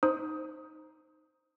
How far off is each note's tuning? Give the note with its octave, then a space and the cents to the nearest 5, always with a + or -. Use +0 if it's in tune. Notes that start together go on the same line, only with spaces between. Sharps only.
D#4 +0 C5 +5 D#6 +15